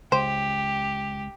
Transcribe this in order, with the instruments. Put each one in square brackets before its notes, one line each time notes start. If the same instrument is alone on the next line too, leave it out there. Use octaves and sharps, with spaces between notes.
[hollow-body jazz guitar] C#2 [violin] G4 [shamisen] C5